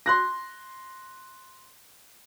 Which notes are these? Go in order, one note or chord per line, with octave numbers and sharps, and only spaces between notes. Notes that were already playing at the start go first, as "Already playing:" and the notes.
C6 F#6 A#6